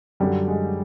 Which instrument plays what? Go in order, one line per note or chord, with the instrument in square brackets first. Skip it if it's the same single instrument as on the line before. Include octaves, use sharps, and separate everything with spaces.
[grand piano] F#2 D3 F#3 [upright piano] G3
[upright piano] G#3